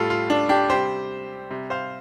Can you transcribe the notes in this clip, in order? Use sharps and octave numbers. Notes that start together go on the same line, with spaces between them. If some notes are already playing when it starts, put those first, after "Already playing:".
Already playing: A2 G3 F4 A4
F4
D4
D4 G4
C3 G3 G4 C5
C3 G3
C5 F5